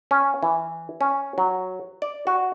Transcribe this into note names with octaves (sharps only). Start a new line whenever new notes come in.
C#4
E3
C#4
F#3
D5
F#4